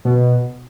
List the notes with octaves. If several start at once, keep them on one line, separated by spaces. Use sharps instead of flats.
B2